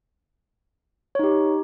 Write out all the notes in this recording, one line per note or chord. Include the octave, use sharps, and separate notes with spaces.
D#4 G4 C#5